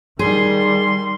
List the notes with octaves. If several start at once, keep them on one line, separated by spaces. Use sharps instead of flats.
D#3 G3 G#4 C6